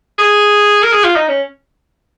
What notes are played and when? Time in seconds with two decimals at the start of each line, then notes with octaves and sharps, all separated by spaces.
0.18 G#4
0.83 A#4
0.92 G#4
1.03 F4
1.16 D#4
1.28 C#4